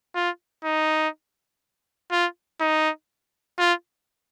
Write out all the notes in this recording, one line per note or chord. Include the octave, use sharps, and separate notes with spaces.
F4
D#4
F4
D#4
F4